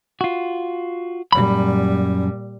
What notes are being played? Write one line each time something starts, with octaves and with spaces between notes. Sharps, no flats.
F4 F#4
F#2 A#2 G3 B5